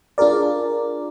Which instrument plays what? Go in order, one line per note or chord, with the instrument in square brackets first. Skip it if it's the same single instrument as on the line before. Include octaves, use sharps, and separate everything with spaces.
[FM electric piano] D4 F4 G#4 A#4 D5